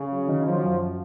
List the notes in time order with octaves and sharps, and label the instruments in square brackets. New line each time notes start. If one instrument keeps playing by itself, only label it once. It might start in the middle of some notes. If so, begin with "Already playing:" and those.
Already playing: [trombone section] C#3
[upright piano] F#3
D#3
[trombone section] F3 [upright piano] F#3
[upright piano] F#2